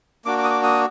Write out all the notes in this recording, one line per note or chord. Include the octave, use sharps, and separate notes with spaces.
A#3 D4 F#4 D6
D6
D#6
D6
D#6